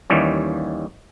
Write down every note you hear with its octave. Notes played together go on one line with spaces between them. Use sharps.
D#2 D#3 E3 G3 C#4